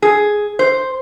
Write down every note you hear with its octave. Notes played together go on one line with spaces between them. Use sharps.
G#4
C5